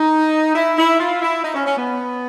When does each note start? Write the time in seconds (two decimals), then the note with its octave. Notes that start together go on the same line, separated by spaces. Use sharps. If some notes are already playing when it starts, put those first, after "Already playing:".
Already playing: D#4
0.55 E4
0.77 E4
1.00 F4
1.22 E4
1.44 D#4
1.54 C#4
1.66 C#4
1.76 B3